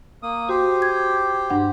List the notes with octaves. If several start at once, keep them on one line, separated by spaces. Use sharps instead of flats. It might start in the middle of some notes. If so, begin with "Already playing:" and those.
A#3 D#6
F#4 G4 C5
G#6
G2 D4 F#5